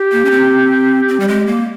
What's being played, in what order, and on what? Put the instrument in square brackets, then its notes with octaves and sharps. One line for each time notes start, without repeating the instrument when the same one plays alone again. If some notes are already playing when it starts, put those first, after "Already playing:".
Already playing: [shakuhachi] G4
[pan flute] A#3
C#4
C4
C4
G3
G#3
A#3